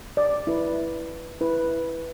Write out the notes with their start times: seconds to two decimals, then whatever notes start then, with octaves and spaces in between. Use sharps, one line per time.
0.17 D5
0.47 E4 B4
1.41 E4 B4